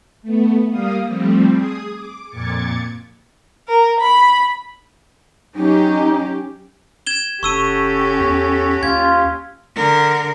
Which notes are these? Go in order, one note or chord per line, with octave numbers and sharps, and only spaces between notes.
A3 B3
G3 A#3 F5 D#6
F3 G3 A3 C4
G#4 D#6
D6
F2 A#2 D6 G#6 A6 C#7
A#4
B5
F#3 C#4 D#4 G4
G#6 E7 G7
F#1 C#4 F#4 G4 A4 C#6 E6 D#7
E2
D#2 F4 G#6
D3 A#4